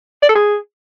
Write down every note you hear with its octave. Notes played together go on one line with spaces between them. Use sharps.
D5
A4
G#4